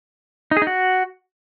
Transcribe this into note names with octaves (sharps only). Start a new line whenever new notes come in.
D#4
G#4
D#4
F#4